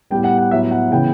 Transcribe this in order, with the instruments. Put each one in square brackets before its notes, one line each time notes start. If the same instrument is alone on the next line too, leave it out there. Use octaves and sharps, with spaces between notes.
[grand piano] A2 G3 B3 G5
F#5
F#5
A2 F#3 B3 E5
F#5
C#3 E3 B3 G5